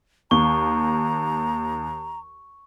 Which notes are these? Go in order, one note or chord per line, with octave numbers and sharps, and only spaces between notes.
D#2 A#5 C#6